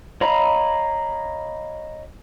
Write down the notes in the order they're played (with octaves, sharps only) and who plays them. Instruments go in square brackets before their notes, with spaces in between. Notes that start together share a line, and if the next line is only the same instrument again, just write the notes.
[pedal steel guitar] C#5 D#5 F5 A#5 B5